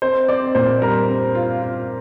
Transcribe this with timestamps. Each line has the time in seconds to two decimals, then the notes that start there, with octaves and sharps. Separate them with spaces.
0.02 C4 C5
0.28 C4 D5
0.55 A#2 C5
0.82 G3 A#4
1.09 C4
1.35 F4
1.62 F4